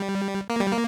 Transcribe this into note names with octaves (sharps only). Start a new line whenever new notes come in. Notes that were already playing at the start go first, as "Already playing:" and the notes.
Already playing: G3
A#3
G3
A#3